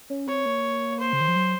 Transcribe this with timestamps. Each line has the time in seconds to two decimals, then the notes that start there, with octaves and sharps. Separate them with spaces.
0.10 C#4
0.27 C4 C#5
0.46 A#3
1.00 C5
1.13 C#3
1.21 D#3
1.28 F3
1.36 F#3